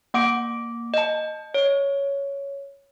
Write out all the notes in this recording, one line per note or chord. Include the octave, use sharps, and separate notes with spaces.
A#3 F#5 D6 D7
D#5 A5
C#5